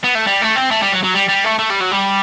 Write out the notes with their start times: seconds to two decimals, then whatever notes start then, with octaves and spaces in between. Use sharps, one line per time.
0.04 B3
0.15 A3
0.27 G3
0.42 A3
0.56 C4
0.71 A3
0.82 G3
0.93 F#3
1.03 F#3
1.15 G3
1.29 G3
1.45 A3
1.59 A3
1.70 G3
1.81 F#3
1.92 G3